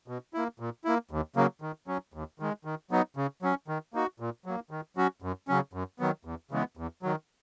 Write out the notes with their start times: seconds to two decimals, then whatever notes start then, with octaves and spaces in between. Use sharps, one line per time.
0.08 B2
0.34 A#3 E4
0.60 A#2
0.85 A#3 E4
1.11 D#2
1.36 C#3 F#3 A#3
1.62 D#3
1.88 F#3 C#4
2.14 D#2
2.40 D#3 G#3
2.65 D#3
2.91 F#3 B3 D#4
3.17 C#3
3.43 F#3 C#4
3.68 D#3
3.94 A#3 D#4 F#4
4.20 A#2
4.46 F#3 A#3
4.71 D#3
4.97 F#3 C#4 F#4
5.22 F#2
5.48 C#3 F#3 C#4
5.73 F#2
5.99 D#3 F#3 B3
6.25 E2
6.51 C#3 E3 G#3 B3
6.77 E2
7.03 D#3 F#3